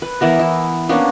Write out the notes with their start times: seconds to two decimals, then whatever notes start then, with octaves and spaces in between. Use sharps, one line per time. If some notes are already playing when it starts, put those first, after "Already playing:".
0.02 B4
0.21 E3 B3 A#4
0.39 E4
0.89 A#3 B3 C#4 D4